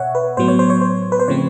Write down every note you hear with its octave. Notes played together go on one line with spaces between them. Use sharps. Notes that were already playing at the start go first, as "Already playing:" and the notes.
Already playing: B2 C#5 E5 F#5
B4
A2 F#3 B3 C5
C#5
C5
C#5
C5
B4
C5
C#3 F3 A3 C4 C#5